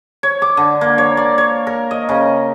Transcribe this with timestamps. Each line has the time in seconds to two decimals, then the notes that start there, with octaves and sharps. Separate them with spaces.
0.23 C#5
0.42 D6
0.57 D3
0.81 A#3
0.98 C#5
1.17 D5
1.38 C#5
1.67 A#4
1.91 D#5
2.09 C#3